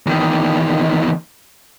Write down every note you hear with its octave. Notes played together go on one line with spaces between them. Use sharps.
E2 D#3